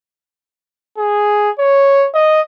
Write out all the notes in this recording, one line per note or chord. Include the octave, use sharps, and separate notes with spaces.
G#4
C#5
D#5